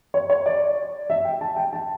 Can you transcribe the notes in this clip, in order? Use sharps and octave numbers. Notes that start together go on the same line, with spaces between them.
C#5
C#5
D5
E5
G5
A5
G5
A5